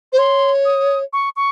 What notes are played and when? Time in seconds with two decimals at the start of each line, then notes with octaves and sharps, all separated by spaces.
0.13 C5
0.18 C#5 C6
0.65 D#6
1.13 C#6
1.36 C#6